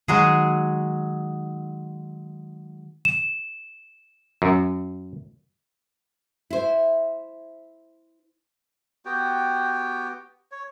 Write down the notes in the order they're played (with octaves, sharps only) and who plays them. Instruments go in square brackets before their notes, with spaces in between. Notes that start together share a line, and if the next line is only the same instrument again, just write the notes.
[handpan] D#3 [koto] F#3 G#3 G#4
[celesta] E7
[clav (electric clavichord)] F#2
[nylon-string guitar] E4 C5
[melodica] B3 F#4 G4 G5
C#5